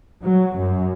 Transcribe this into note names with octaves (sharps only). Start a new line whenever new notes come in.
F#3
F#2